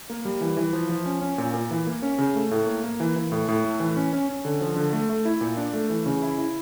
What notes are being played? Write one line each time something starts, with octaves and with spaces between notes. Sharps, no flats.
A#3
G3
E3
E3
F3
F3
C#4
C#4
A#2
A#2
E3
A#3
C#4
C#3
A3
A2
A#3
A#3
E3
E3
A2
A2
A3
E3
C#4
C#4
C#4
D3
F3
D3
A3
A3
E4
A#2
D4
A3
E3
C#3
E4
E4